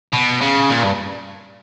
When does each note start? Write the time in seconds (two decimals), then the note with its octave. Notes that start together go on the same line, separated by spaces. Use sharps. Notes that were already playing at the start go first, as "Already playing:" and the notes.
0.13 B2
0.42 C#3
0.70 A#2
0.83 G2